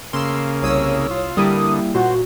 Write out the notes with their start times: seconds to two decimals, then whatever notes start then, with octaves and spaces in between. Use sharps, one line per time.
0.13 C#3 A#3 C6 E6
0.62 C2 C#5 D#6 E6
1.11 F4
1.37 D3 G3 A#3 E4 D#6
1.95 A#2 F#4 C5